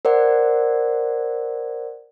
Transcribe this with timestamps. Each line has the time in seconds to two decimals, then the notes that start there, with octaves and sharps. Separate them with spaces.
0.05 A#4 C5 D5 F#5